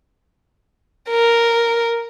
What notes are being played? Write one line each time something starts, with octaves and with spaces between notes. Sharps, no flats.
A#4